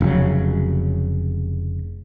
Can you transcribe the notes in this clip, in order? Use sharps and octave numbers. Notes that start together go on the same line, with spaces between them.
F1 C#3 F#3